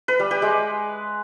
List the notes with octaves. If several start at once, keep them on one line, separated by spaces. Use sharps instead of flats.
B4
G3
G4
G#3